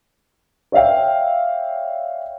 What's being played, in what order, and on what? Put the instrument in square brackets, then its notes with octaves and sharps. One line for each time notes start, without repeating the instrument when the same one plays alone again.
[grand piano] C#5 D5 E5 F5 G5